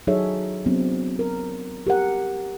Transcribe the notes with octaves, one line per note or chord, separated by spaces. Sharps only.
F#3 D#4 G#4 A4 C#5 E5
F#3 B3 C4 D4
A#4
G4 A#4 F#5